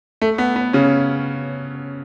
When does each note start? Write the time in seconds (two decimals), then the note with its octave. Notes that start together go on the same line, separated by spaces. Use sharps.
0.22 A3
0.38 B3
0.56 B3
0.73 C#3 C#4